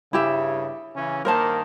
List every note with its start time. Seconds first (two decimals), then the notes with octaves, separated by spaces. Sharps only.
0.13 G2 C#3 E4 G4 E5
0.96 C#3 E3 C#4
1.25 G2 D#3 A#3 A#4 C5 A5